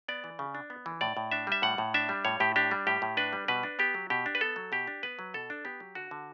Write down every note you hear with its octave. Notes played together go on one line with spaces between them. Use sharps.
B3 D5
E3
C#3
D4
B3
E3
A2 D5
A2
D4 E5
G3 E5
A2 F#5
A2
D4 E5
G3
A2 C#5
A2 G4
D4 G4
G3
A2 G4
A2
D4 B4
G3
B2 B4
D4
B3 G4
F#3
B2 G4
D4
B4
B3 A4
F#3
B2 G4
D4
B3 B4
F#3
B2 A4
D4
B3 G4
F#3
D3 F#4
D3